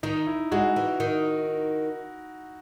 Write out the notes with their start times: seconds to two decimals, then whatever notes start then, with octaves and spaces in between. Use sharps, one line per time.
0.03 D#3 D#4
0.27 E4
0.52 G#3 F#4
0.76 E3
1.00 D#3